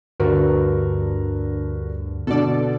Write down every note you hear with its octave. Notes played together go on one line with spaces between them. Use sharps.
D2 G2 D3 F#4 A#4 B4
B2 D3 A4 D5